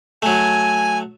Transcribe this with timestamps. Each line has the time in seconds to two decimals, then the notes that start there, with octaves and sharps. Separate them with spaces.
0.22 F#3 A3 G#5